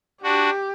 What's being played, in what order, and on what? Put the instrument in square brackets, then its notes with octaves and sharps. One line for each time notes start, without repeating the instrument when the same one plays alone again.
[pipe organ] D4 F#4 [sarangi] G4